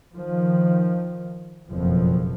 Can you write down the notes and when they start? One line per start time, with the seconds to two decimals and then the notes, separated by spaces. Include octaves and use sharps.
0.15 D#3 F3
1.70 F#1 F2 B2 F3